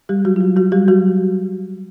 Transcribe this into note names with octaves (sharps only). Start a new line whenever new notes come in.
G3 G4
F#3 F#4
F4
F#3 F#4
F#3 F#4
G3 G4
F#3 F#4